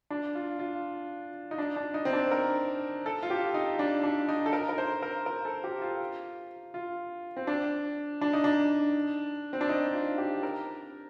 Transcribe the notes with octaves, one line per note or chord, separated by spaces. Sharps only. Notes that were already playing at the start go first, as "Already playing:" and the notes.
D4
F4
F4
D#4
D4
D4
D#4
C4
D4
A#4
A4
F4
G4
D#4
D4
D4
D#4
A4
A#4
A#4
C5
A#4
A#4
A4
G4
F4
F4
C4
D4
D4
D#4
D4
C4
D4
D#4
F4
G4
A#4